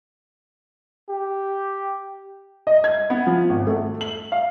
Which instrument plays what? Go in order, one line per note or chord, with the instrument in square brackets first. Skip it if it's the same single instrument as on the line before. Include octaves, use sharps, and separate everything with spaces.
[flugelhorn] G4
[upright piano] D#5
G#6
B3
F3
G#1
A3
F#7
F5